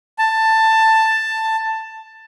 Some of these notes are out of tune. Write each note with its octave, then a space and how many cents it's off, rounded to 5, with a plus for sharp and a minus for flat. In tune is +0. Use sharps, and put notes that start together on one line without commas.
A5 +10